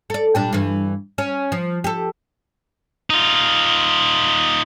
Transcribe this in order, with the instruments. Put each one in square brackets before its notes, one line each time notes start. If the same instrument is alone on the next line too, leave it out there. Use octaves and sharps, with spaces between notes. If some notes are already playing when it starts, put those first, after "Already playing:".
[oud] A4 D5
A#2 G3 D4
G2 E3
C#4
F3
G4 A4
[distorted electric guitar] D#4 F4